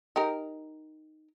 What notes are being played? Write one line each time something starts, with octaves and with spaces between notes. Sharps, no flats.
D#4 G4 A#4